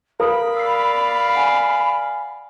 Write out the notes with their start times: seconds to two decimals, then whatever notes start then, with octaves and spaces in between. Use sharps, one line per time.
0.20 A#4 F5 B5 D#6
0.57 D5 F5 E6 C7
1.35 F#5 G#5